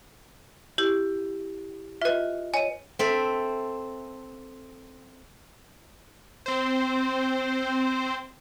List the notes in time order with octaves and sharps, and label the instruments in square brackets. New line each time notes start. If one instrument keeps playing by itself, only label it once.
[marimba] E4 G4
[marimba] F4 D#5 [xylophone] B4 E5
[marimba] C#5 D#5 [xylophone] G#5 D#7
[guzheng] C4 A4 E5
[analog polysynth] C4 C5